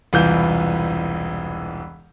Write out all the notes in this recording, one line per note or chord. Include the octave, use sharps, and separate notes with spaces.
E1 C2 E3 F4 G6 G7